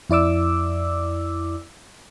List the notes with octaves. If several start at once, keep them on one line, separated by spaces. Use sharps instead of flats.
F2 E4 D5 D6 E6